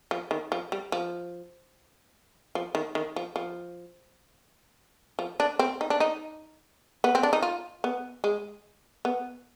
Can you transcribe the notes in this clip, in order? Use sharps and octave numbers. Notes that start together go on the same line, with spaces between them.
F3
D#3
F3
G3
F3
F3
D#3
D#3
F3
F3
F3
D4
C4
D#4
D4
D#4
B3
C4
D4
D#4
F4
B3
G#3
B3